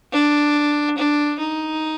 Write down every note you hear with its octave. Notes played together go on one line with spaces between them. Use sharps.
D4
D4
D#4